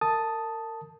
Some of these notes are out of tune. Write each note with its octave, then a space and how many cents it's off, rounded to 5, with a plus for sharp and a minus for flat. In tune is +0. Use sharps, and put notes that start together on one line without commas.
A#4 -30 A5 +0 D#6 +0